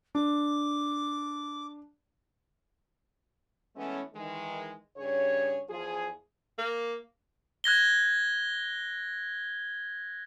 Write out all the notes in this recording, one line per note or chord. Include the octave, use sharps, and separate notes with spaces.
D4 D6
E3 G#3 A3 B3 C#4
D#3 E3 G#3
G2 C#3 G#4 C#5
E2 F3 F4 G#4
A#3
F#6 G#6 A#6 G7